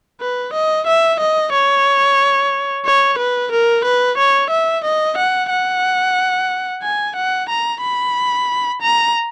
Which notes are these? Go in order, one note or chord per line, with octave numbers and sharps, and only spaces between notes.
B4
D#5
E5
D#5
C#5
C#5
B4
A#4
B4
C#5
E5
D#5
F#5
F#5
G#5
F#5
A#5
B5
A#5